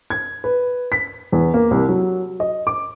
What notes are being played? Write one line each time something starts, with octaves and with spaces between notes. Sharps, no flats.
G#6
B4
B6
E2
A#3
C2
F#3
D#5
D6